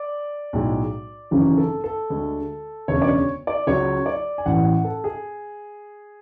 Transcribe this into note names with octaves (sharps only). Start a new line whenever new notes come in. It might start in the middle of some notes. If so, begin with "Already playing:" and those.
Already playing: D5
B1 A2 G#3
G#1 F#2 C#3 E3
A4
A4
D2 D3 G#3
E1 D2 C#3 C#5
D5
C#5
D5
C#2 C#3 F#3 C#5
D5
G#5
A1 A2 E3 F#5
F#5
A4
G#4